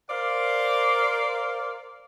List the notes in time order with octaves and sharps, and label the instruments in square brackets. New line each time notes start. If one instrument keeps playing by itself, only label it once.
[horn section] A#4 C5 D5 F5